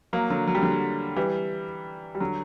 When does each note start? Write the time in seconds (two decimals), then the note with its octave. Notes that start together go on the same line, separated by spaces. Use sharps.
0.13 F#3 A#3
0.30 D3 F#3
0.47 F#3
0.55 G3
0.62 D3 F#3
1.16 E3 G3
2.15 G3
2.20 D3 F#3